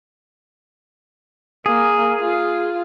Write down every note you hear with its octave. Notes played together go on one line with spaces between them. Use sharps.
A#3 G#4
F4